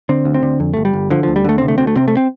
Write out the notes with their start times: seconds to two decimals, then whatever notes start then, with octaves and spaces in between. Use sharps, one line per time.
0.09 D3 C4
0.25 D2
0.34 C4
0.43 D3
0.60 F2
0.74 G1 A3
0.85 G3
0.93 G1
1.10 D3 F3
1.23 D2 F3
1.36 G3
1.44 D3 A3
1.58 C3 C4
1.68 A3
1.78 D2 C4
1.87 A3
1.96 C3 C4
2.08 A3
2.17 C4